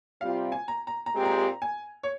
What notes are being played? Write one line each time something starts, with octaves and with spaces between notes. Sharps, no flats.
C3 G3 C4 F4 F5
G#5
A#5
A#5
A#5
A#2 G#3 C4 G4
A#5
G#5
C#5